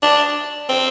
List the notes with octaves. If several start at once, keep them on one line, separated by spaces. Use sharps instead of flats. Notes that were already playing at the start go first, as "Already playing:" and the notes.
D4
C4